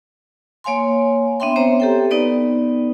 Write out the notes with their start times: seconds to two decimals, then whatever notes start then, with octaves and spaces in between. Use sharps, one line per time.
0.64 A#3 C#5 F5 G#5 C6
1.40 B3 D4 E5 G5 C6
1.56 B3 C4 C5 C#5 E5 A#5
1.80 G4 A4 G5
2.11 B3 D#4 B4 D5